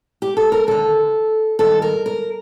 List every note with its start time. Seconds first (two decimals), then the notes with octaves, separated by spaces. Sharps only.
0.22 G4
0.37 A4
0.52 A#4
0.67 D#2 D3 A4
1.59 G2 D#3 A4
1.82 A#4
2.06 A#4